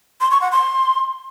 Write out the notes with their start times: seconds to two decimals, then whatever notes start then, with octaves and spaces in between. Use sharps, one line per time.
0.21 C6
0.31 C#6
0.41 F#5
0.52 C6